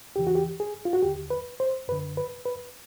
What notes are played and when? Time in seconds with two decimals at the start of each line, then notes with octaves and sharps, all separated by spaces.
0.16 E2 C#3 E3 G4
0.27 F#4
0.35 G4
0.60 G#4
0.85 F4
0.93 F#4
1.02 D#2 D3 G4
1.30 B4
1.60 C5
1.88 F#2 D3 B4
2.17 B4
2.45 B4